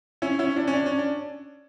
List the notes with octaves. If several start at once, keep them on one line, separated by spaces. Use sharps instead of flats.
C#4 E4
C#4 E4
D4
C#4
D4
C#4
D4